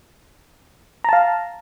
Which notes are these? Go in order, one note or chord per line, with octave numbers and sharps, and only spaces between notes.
F5 A5 A#5